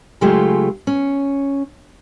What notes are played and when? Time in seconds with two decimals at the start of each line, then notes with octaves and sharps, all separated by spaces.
0.21 C#3 F#3 G#3 A3 F4 G4
0.87 C#4